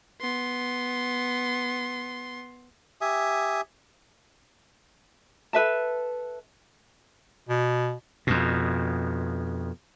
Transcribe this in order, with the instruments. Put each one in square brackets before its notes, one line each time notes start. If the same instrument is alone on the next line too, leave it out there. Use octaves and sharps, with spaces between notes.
[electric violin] B3 C6
[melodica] G4 E5 G#5 D#6
[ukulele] A4 B4 E5 A5
[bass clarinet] B2
[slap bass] F2 B2